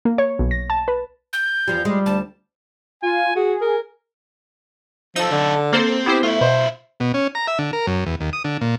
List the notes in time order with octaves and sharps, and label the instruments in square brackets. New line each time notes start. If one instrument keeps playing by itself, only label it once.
[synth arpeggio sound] A#3
C#5
B1
A#6
A5
B4
[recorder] G6
[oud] E2 F3 G3
[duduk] G3 [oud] G#3
[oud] D2 [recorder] A5
[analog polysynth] F4 [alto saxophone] G#5
[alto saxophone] F#4 [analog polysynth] G#4
[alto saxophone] A#4
[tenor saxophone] F3 [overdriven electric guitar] D#4 A4 [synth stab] E6
[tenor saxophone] D3
[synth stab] A#3 A4 C5 [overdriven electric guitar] C4
[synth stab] B3 E4 C5 [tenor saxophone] G4
[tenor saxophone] A3 [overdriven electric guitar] F4 E5
[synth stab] B2 [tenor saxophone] C5
[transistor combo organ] B2
C#4
A#5
E5
D3
A#4
F#2
E2
D#2
D#6
D3
A#2